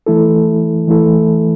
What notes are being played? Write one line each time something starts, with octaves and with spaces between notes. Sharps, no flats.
E3 A3 E4 A4
E3 A3 E4 A4